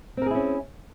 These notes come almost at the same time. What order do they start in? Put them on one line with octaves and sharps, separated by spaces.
C4 A#4 G#4 E4 C#4